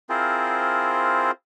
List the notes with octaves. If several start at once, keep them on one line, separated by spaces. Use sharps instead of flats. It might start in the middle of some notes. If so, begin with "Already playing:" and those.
C4 E4 F4 G#4 A#4 C5